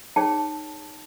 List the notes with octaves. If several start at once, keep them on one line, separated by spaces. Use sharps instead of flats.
D#4 G#4 C#5 G5 A5